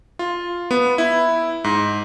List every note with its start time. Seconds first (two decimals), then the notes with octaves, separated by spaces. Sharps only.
0.19 F4
0.71 B3
0.98 E4
1.64 G#2